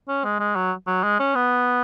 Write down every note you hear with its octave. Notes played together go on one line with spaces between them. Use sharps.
C#4
G#3
G#3
F#3
F#3
G#3
C#4
B3